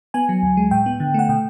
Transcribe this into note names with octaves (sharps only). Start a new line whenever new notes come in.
B3 G#5
F#3
D2
G#3
A2 G5
B3
D3
A3 F#5
B2 G5